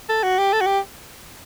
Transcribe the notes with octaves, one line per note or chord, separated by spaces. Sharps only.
A4
F#4
G4
A4
F#4
G4